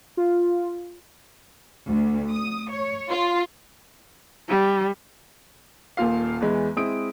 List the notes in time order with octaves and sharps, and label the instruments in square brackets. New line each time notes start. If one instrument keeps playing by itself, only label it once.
[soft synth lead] F4
[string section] D2
D#6
C#5
F4
[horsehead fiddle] G3
[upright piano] D#1 A#2 F4 F5
E2 E3 G#3
G#3 C4 E4 D#6 D7